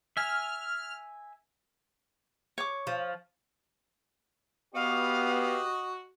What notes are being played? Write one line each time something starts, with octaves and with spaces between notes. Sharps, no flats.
E5 G#5 F6
C#5 D6
F3
B3 F#4 G4 D#5 F5